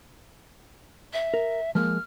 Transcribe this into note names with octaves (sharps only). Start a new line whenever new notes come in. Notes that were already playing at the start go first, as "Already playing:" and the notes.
E5
A#4
F3 G#3 A#3 F6